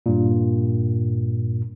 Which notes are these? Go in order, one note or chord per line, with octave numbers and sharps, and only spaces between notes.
G2 A#2